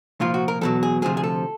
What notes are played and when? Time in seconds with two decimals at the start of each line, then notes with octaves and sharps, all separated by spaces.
0.20 C2 A#2 F3 F4
0.34 F#4
0.48 A#4
0.61 E2 B2 F#3 A4
0.83 G#4
1.02 D2 C3 F3 G#4
1.17 G#4
1.24 A4